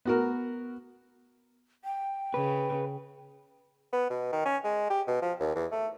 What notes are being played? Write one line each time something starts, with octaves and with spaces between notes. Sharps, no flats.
B3 F#4 A#4
G5
C#3 B4
B3
B2
D#3
C#4
G#3
G4
B2
F3
D#2
E2
A3